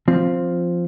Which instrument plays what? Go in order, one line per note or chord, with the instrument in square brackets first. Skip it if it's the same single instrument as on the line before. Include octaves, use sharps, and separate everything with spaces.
[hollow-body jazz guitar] F3 C4